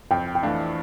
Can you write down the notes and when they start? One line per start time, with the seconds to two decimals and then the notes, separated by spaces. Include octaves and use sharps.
0.11 F2 G5
0.35 G5
0.43 E3 A3 D4 F5